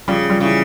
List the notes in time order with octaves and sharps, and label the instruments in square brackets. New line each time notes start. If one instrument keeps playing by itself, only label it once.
[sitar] C#3 [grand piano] F3 G3
[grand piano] F3 G3
[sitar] C#3 [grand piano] E3